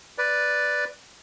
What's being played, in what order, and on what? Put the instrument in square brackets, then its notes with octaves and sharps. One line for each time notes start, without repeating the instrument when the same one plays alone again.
[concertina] B4 D5